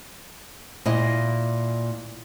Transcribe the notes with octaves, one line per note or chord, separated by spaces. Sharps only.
A#2 E4 D#5